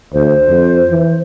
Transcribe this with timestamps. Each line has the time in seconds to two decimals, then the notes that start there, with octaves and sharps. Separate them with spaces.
0.13 D2 C5
0.49 F2
0.90 E3